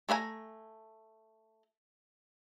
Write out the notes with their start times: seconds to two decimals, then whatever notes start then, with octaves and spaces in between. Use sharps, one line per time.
0.09 A3 G#4 B4 G#5 A#5